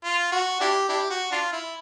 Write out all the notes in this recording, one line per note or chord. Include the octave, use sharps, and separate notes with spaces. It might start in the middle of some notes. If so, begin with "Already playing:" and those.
F4
F#4
D4 E4 G4
D4 E4 G4
F#4
D4 F4
E4